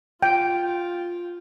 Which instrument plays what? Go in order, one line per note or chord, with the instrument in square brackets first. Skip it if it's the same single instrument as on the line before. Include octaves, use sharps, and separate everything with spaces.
[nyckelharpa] F4 [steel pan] G5